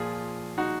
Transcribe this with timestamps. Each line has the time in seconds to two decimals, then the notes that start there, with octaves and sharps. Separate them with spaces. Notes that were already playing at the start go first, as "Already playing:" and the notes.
Already playing: A#2 F3 F4 G#4
0.58 D#4 F#4